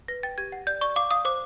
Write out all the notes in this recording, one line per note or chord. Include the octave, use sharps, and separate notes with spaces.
B4 A#6
G5 A6
G4 G#6
F#5
D5 G6
D5 C#6
F5 D6
F5 D#6
C5 D6